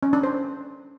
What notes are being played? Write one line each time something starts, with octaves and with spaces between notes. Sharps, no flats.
C#4
D4
C5